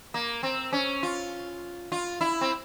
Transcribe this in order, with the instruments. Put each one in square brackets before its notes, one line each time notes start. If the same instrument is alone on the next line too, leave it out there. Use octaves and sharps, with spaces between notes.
[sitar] A#3
C4
C#4
F4
F4
E4
C4